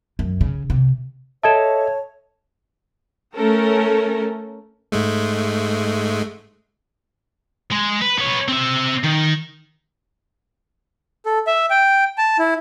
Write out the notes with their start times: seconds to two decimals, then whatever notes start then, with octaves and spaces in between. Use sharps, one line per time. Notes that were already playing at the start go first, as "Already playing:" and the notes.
0.19 F#2
0.41 C#3
0.70 C3
1.43 A4 C#5 D#5 E5 A5 G#6 E7
3.33 A3 C#4 A4 A#4
4.92 G#2 G#3 A3
7.72 G#3
8.02 B4
8.19 B3 C#5
8.48 C4 E5
9.03 D#3
11.26 A4
11.47 E5
11.70 G5
12.18 A5
12.39 E4